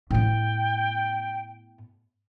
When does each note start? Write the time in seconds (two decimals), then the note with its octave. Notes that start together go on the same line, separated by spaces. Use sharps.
0.10 A2 B3 G5